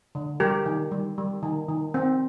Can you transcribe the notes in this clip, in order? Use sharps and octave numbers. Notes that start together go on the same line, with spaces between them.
D3
G3 G4 A#4
D#3
G3
G3
D#3
D#3
C4